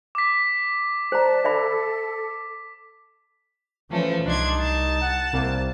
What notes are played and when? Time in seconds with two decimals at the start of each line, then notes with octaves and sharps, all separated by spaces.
0.15 D6 B6
1.12 C5 D5 A5 A#5
1.44 A4 D5 E5 B5
3.91 E3 F3 A3 C#4
4.25 C2 D4 D#4 C6 G#6
4.59 A5
5.01 F#5
5.33 C2 A#3